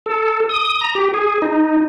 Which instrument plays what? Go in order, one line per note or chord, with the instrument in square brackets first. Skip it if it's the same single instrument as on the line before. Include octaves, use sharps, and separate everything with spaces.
[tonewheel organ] A4
D#6
A#5
G4
G#4
D#4